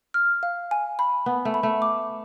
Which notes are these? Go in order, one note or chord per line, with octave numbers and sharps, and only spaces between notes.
F6
F5
G#5
B5
B3 F#5
A3
B5
A3
D6